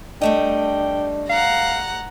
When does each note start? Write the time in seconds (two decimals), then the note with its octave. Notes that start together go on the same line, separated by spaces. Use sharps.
0.21 G3 A3 D4 D#5 G5
1.29 F5 F#5 A#5